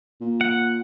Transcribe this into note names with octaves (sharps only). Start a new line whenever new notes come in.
A#2
F#5